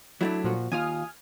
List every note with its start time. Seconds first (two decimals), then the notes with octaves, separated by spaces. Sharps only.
0.21 F#3 A3 D4 E4
0.44 A#2 F3 F#4
0.72 D#2 F4 G#5 D#6 F6